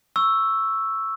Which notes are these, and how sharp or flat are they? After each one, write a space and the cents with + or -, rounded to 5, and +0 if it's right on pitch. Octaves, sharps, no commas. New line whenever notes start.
C#6 +0 E6 +0